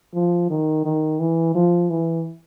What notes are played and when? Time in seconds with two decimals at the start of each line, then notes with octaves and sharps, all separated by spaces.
0.14 F3
0.50 D#3
0.85 D#3
1.20 E3
1.55 F3
1.90 E3